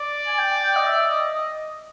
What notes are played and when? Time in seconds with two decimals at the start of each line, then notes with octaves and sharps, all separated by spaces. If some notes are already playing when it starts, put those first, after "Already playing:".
Already playing: D5
0.27 G#5
0.38 G5
0.62 G5
0.76 D#5
0.86 E5
1.09 D#5
1.33 D#5